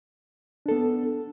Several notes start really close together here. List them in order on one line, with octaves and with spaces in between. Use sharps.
D4 A4 B3